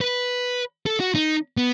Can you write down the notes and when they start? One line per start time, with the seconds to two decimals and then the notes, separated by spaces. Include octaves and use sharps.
0.01 B4
0.86 A4
1.01 F#4
1.15 D#4
1.57 B3